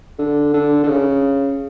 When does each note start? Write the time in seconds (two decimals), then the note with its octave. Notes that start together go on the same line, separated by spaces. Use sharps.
0.19 D3
0.54 D3
0.84 D3
0.88 C#3